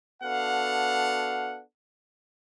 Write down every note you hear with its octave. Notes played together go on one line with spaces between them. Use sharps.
B3 D4 F#4 A4 F5 F#5